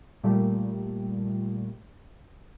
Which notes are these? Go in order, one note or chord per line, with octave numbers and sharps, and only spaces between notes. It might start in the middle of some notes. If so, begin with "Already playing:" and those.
A#2 G3 A3